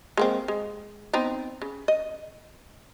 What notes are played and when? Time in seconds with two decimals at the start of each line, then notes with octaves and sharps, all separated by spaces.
0.17 G#3 A#3 C4
0.48 G#3
1.13 B3 C4 D#4
1.62 C#3
1.88 D#5